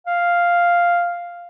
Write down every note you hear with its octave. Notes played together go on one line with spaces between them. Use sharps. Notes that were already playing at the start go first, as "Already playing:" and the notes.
F5